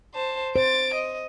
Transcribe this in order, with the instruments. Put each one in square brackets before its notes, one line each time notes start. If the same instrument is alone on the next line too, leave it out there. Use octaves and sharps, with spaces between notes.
[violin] C5 A5
[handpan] C5 [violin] A6 D7
[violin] D#5